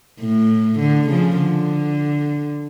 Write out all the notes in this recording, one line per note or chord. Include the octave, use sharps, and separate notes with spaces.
A2
D3
C#3 F3
D3